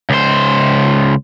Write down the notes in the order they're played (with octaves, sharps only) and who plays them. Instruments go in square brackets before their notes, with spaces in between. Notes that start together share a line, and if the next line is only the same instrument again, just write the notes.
[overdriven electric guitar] C#2 C5